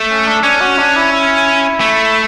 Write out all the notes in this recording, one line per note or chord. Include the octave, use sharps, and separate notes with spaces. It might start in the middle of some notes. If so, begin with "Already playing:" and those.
Already playing: A3
C#4
D4
C#4 D4
F#4
D4
E4
E4
A3